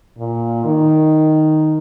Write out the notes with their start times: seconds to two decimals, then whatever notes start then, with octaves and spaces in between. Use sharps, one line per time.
0.18 A#2
0.65 D#3